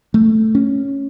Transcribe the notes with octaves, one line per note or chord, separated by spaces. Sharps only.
A3
C#4